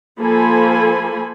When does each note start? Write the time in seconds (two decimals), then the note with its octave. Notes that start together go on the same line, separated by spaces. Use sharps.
0.19 F3 A#3 A4 C5 G#5 B5